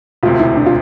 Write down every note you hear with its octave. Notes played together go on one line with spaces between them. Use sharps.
E1 D2 C3 F4
E4
D4
F4